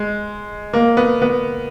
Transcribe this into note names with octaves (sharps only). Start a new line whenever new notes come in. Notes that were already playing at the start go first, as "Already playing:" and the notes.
Already playing: G#3
A#3
B3
B3